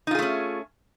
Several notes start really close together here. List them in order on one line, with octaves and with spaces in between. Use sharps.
D#4 F4 G#4 A3 C#4